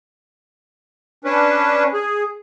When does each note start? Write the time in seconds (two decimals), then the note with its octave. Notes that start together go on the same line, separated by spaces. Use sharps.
1.24 C#4 D4 B4
1.93 G#4